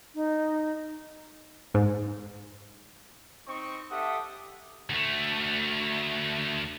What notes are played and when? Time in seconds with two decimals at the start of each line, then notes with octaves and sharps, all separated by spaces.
0.15 D#4
1.74 G#2
3.48 C4 D#4 C#6
3.91 G4 A4 E5 F#5 D#6
4.90 D2 A3